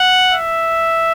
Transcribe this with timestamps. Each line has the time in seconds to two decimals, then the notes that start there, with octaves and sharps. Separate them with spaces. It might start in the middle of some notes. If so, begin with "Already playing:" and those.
Already playing: F#5
0.32 E5